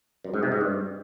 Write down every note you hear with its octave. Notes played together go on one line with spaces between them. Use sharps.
F#2
G#2
C3
G#2
G2